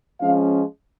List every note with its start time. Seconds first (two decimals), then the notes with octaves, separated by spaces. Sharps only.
0.21 F3 G#3 C#4 F5